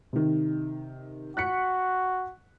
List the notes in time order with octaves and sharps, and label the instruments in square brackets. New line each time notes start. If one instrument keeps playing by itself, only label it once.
[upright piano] C3 D#3
[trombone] F#4 [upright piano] F#6 B6 C#7